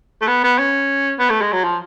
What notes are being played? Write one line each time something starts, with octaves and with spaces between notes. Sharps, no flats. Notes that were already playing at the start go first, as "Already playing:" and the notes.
A3
B3
B3
C#4
B3
A3
G#3
F#3
F3